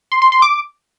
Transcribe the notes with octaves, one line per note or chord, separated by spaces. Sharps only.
C6
C6
C6
D6